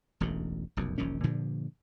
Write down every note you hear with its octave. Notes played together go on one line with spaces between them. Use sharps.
E1 A1 D2 A2
F1 B1 F#2
E1 A#1 D#3 C#4
G2 A#2 D3 F3